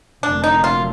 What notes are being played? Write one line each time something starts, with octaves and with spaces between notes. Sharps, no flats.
F1 F2 D3 F#3 A#3 D4
D#4
F4